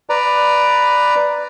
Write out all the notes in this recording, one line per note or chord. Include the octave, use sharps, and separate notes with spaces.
B4 D5 A#5